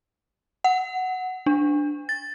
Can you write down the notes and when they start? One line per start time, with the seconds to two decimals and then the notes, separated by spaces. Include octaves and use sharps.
0.64 F#5
1.46 D4
2.09 A6